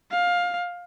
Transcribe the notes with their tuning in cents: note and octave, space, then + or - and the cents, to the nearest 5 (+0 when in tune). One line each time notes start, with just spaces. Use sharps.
F5 +20